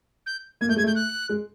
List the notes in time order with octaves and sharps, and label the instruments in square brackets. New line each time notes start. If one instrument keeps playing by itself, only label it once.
[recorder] G6
[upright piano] A#3 [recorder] G#6
[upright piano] A3 [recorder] G6
[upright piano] G#3 [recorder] G#6
[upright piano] A3 [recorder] G6
[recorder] F#6
[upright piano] G#3